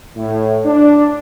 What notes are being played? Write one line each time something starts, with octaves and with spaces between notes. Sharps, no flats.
A2
D4